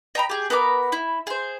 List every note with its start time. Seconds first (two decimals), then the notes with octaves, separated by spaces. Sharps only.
0.15 D#5 G5 A#5 B5
0.30 G4 G#4
0.50 B3 A#4 B5 D6
0.92 E4
1.27 G#4 C5